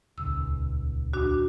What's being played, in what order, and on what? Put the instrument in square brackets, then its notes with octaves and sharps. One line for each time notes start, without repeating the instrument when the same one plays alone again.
[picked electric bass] D#1 C#2 [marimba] E6
[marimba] D4 F#4